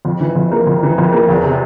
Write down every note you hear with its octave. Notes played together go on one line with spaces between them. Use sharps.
F2
E3
F2
A#3
F2
E3
F2
A#3
E2
C3